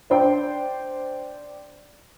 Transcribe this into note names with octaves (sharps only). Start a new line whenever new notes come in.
D4 C5 G5